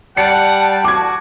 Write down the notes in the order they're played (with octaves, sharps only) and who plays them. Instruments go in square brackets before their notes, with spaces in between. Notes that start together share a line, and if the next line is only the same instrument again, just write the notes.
[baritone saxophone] G3 [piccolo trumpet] F#5 [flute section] A5 [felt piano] C#7
[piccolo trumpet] F#4 [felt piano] D6 G#6